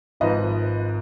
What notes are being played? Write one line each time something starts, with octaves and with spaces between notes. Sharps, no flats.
G#1 G#2 F3 B4 D#5